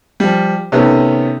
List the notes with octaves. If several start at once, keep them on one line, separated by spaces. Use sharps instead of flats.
F3 G3
C3 D#3 A3 B3 C#4